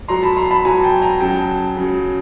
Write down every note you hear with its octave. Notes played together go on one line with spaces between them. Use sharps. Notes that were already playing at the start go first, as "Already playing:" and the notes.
B2 F#3 A#5 C6
A5 B5
A#5 C6
A5 B5
B2 F#3 G#5 A#5
G5 A5
G#5 A#5
C#3 F#3 G5 A5
C#3 F#3